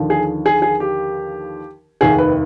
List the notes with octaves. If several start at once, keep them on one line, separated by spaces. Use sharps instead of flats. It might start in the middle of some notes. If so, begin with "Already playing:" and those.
Already playing: D#2 D3 F3
G#4
G#4
G#4
G4
F1 D#2 D#3 G#4
B4